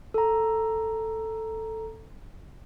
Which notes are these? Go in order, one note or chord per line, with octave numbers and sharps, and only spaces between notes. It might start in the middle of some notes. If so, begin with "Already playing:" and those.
A4 A#5